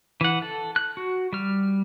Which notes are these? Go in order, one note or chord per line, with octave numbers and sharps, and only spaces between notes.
E3 F#5
A4
F#6
F#4
G3 F6